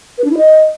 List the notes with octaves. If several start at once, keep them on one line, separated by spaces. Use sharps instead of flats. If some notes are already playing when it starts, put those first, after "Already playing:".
B4
D4
E4
D#5